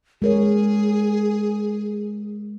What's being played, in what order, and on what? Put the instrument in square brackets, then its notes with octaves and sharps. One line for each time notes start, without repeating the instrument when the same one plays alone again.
[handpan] G#3 A#4 C#5 [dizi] G#4